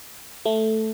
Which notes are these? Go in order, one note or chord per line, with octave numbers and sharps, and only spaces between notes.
A3